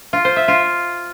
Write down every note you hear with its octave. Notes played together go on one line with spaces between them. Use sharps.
F4
C5
E5
F4